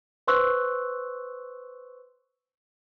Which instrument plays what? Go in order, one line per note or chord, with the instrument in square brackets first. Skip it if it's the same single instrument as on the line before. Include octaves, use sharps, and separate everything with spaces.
[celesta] B4 C5 C6 C#6 E6 F#6